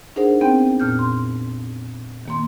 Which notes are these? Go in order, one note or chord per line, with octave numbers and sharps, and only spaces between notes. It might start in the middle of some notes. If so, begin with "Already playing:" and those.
D4 D#4 G#4 A#4 C5 F#5
B3 C4 G5 G6
F2 A#2 F6 G6
C6
D#3 A#3 C6